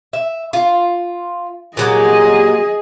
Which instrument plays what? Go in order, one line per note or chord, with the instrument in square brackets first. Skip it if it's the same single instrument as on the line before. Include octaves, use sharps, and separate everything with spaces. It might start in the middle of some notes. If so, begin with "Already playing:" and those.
[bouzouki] E5
F4
[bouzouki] A#2 F#3 G4 [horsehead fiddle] G#4 D#5